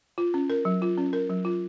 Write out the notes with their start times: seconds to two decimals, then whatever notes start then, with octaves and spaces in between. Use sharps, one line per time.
0.18 F4
0.34 C#4
0.50 A#4
0.65 F#3
0.82 F4
0.98 C#4
1.13 A#4
1.30 F#3
1.45 F4